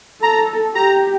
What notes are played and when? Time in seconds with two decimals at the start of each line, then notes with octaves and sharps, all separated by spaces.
0.22 A4 A#5
0.74 G4 A#5